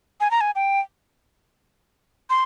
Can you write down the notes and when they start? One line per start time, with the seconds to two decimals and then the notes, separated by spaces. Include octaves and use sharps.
0.20 G#5
0.31 A#5
0.41 G#5
0.55 G5
2.30 C6